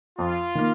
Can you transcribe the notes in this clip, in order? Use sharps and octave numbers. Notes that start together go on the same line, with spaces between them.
F2 F4
D#3 A#3